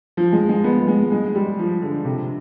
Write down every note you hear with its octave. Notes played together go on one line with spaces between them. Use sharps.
F3
G#3
G#3
B3
G#3
G#3
G3
F3
D3
C3